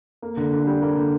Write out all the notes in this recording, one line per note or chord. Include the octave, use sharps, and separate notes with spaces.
A#3
D3
D3
G3
A#3
D3